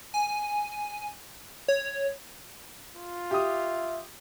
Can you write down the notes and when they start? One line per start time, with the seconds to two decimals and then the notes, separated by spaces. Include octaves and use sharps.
0.14 G#5
1.68 C#5
2.96 F4
3.31 G4 E5 D#6